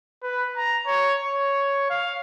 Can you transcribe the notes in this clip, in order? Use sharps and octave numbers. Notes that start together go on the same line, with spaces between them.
B4
A#5
C#5
C#5
F5